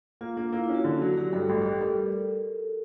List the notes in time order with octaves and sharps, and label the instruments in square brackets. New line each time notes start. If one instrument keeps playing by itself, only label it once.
[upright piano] A#3 [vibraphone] F4
[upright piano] A#3 [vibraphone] D4
[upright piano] A#3 [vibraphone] E4
[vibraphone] E4
[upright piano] C#4
[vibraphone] F#4
[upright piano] D3
F#3
[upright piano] F#3 [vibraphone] G4
[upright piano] G2 [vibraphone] A4
[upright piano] A1
G3
[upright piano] G3 [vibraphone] A#4